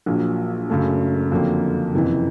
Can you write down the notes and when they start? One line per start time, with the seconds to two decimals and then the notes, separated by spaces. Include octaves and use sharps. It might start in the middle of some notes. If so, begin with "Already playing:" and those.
0.06 A#1 A#2 F#3
0.70 F#1 F#2 C#3 F#3 A3
1.32 F2 D3 F#3 A#3
1.94 F#1 F2 C3 E3